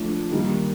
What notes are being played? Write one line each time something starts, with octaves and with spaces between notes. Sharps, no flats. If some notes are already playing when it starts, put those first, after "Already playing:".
Already playing: F3 A3 D4
D#3 G3 A#3